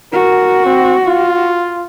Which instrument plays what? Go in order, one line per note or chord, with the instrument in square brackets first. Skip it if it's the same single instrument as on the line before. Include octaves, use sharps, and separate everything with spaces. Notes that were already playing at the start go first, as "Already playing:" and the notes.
[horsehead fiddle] F#4 [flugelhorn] A#4
[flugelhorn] C4
F4